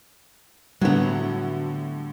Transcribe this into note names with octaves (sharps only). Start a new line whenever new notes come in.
A2 D3 F#3 G3 B3